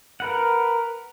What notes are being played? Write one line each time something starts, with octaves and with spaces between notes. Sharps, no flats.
A#4 B4 F#5